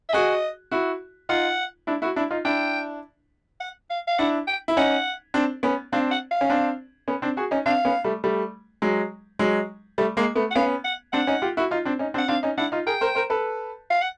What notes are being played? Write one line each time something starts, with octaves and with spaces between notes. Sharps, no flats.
E5
F#4 G#4 D#5
E4 F#4
D#4 F4 F#5
D4 E4
E4 F#4
D4 E4
D#4 F4
D4 E4 G5
F#5
F5
F5
D4 E4 F#5
G5
E4
C#4 D#4 F#5
C4 D4
B3 C#4
C4 D4 F5
F#5
F5
C#4
C4 D4
B3 C#4
C4 D4
F#4 G#4
C#4 D#4
C4 D4 F5
B3 C#4
G3 A3
G3 A3
F#3 G#3
F#3 G#3
G3 A3
G#3 A#3
A3 B3
F#5
B3 C#4 F5
F#5
C4 D4 F#5
C#4 D#4
F4 G4
E4 F#4
D#4 F4
C4 D4
C#4 D#4
C4 D4
F#5
C4 D4 F5
C#4 D#4
D4 E4 F#5
D#4 F4
G#4 A#4 G5
A#4 C5
A#4 C5
A4 B4
F5
F#5